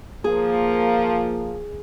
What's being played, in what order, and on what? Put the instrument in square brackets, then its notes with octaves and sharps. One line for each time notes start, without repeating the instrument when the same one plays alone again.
[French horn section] F3 A#3 [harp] G#4